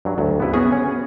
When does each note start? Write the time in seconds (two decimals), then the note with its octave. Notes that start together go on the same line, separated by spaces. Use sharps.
0.05 G2 F#3
0.18 D2 F#3
0.40 G2 C#3 B3 E4 B4
0.54 B3 C#4 F#4 G#4
0.72 C#4